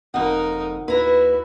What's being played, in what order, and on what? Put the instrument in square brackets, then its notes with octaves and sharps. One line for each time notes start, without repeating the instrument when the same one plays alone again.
[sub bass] F#1 [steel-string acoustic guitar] F2 F#5 [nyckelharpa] D#4 A#4
[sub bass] D#2 [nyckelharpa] E4 F#4 [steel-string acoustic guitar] B4 A#5